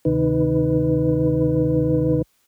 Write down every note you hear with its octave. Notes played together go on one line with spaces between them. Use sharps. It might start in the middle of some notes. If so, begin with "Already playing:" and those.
D2 C3 D#3 D#4 B4